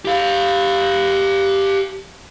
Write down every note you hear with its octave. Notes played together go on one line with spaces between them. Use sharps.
G4 F5